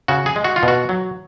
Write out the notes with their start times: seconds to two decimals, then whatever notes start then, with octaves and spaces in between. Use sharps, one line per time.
0.08 C#3 F#4
0.26 G#4
0.36 G#3
0.44 F#4
0.56 F4
0.63 B2
0.68 F#4
0.89 F#3